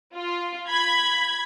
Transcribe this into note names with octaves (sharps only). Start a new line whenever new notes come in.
F4
B5 G#6